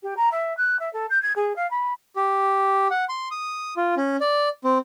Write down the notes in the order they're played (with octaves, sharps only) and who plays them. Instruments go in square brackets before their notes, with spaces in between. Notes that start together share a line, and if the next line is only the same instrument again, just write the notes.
[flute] G4
A#5
E5
F#6
E5
A4
G6
G#6
G#4
F5
B5
[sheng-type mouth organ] G4
F#5
C6
D#6
F4
C#4
D5
C4